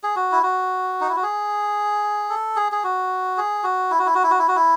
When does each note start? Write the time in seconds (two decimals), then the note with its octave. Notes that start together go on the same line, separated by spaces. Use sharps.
0.03 G#4
0.16 F#4
0.32 E4
0.43 F#4
1.01 D#4
1.09 E4
1.16 F#4
1.23 G#4
2.30 A4
2.56 G#4
2.72 G#4
2.84 F#4
3.37 G#4
3.64 F#4
3.91 E4
3.99 F#4
4.06 E4
4.15 F#4
4.24 E4
4.31 F#4
4.39 E4
4.48 F#4
4.56 E4